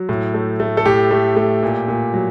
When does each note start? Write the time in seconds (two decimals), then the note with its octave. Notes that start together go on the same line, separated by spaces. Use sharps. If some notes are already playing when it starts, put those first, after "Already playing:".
Already playing: F#3
0.09 A2
0.34 A3
0.60 A3
0.77 A4
0.85 A2 G4
1.11 A3
1.37 A3
1.62 A#2
1.88 A#2
2.13 F#3